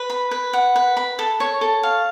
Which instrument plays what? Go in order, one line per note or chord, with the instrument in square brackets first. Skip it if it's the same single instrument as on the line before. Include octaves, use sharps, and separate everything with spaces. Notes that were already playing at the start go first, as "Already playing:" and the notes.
Already playing: [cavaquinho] B4
B5
B4
F#5
B4
B5
A4
C#5
A4
F5